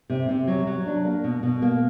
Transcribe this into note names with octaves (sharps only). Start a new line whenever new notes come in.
C3
C3
F#3
F#3
D4
A#3
B2
B2
A#3